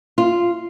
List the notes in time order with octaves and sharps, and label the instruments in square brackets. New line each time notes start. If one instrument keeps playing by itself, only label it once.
[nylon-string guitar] F4